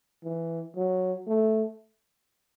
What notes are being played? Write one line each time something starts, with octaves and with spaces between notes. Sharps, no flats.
E3
F#3
A3